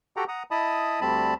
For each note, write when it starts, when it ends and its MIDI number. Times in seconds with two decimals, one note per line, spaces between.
0.16 0.24 66
0.16 0.24 67
0.16 0.24 69
0.16 0.24 78
0.16 0.24 79
0.16 0.24 82
0.28 0.43 78
0.28 0.43 82
0.28 0.43 87
0.51 1.00 64
0.51 1.00 75
0.51 1.00 81
0.51 1.00 83
0.51 1.00 87
1.01 1.34 38
1.01 1.34 50
1.01 1.34 55
1.01 1.34 60
1.01 1.34 81
1.01 1.34 83